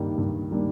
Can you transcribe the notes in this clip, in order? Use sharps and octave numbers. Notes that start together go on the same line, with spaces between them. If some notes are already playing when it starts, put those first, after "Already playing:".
Already playing: G2 D#3 G3 A#3 D4
G2
D#3 G3 A#3 D4